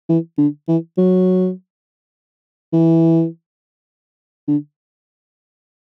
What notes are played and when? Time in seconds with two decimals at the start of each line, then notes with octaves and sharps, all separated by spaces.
0.09 E3
0.38 D3
0.68 E3
0.97 F#3
2.73 E3
4.48 D3